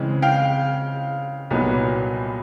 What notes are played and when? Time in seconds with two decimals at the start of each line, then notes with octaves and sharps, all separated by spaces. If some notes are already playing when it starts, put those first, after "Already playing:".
Already playing: C#3 E3 G#3 C4
0.22 F5 G5
1.50 C2 A#2 F#3 B3 D#4